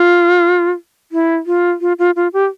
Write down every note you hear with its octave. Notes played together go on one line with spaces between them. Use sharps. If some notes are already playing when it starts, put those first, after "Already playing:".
Already playing: F4
E4
F4
F4
F4
F4
G4